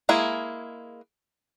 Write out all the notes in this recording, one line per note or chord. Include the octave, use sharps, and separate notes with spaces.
G#3 A#3 E4 G#4